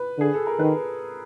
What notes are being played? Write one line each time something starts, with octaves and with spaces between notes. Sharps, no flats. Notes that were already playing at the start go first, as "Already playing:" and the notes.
Already playing: B4
D3 G#4
A4
A#4
D#3 B4